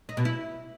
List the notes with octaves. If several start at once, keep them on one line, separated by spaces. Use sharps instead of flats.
D#4
B2
E4